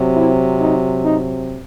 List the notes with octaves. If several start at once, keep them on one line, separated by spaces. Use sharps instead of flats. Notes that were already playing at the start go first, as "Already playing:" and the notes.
Already playing: C3 F#3 C4
E4
D#4
D#4